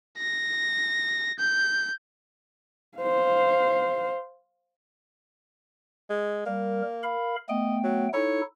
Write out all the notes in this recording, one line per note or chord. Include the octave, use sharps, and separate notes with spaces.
A#6
G6
C5 F5
G#3
G3 A#3 A#4
A#4 F5 B5
A3 B3 D#5 G5
F#3
D#4 E4 A4 C#5